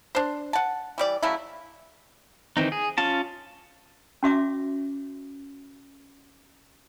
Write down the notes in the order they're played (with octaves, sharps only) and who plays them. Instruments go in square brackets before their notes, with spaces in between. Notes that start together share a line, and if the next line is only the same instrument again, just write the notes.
[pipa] D4 C5
F#5 A5
E3 G3 D5
C#3 F#3 A3 E4
[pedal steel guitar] D#3 E3 C4 D#4
G#4
C#4 F4 A5
[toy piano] C#4 F#4 E5 D6